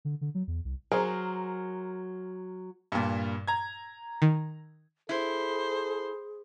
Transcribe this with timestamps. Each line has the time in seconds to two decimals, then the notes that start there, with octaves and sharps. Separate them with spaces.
0.05 D3
0.21 D3
0.35 F#3
0.47 E2
0.65 C2
0.92 F#3 G#4 A#4 C5
2.92 G2 A#2
3.48 A#5 G#6
4.22 D#3
5.09 E4 G#4 A4 C5